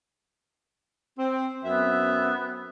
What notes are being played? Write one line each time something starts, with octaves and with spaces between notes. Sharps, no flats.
C4
F#2 B3 C4 E5